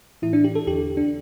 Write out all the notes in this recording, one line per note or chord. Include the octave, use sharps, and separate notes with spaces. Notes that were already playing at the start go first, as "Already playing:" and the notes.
A2 E3 E4
D4
G4
A4
E2 D3 G4
D4